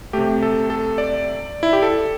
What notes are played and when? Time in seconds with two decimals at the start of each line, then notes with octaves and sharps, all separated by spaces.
0.13 C3 A3 G4
0.43 A4
0.70 A4
0.98 D5
1.63 E4
1.73 G4
1.82 A4